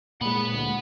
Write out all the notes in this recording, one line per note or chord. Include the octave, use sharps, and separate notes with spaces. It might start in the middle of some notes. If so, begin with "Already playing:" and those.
A#2 G#3 F#5 B5
D2